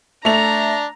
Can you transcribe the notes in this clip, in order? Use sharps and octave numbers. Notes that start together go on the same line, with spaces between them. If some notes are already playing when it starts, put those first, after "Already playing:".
A3 D4 A#5 F7